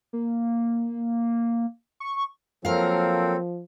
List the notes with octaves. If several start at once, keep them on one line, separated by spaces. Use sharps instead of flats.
A#3
C#6
F3 F#3 A#3 C4 A4 A#4 F5